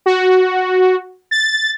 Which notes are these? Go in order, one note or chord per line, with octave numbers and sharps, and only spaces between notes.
F#4
A6